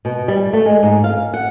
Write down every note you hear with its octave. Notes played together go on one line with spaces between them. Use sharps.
B2
G3
A3
G#3
G#2
F5
F#5